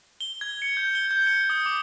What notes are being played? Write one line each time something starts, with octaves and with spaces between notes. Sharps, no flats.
G7
G#6
C#7
G6
G7
G6
C#7
D#6
D6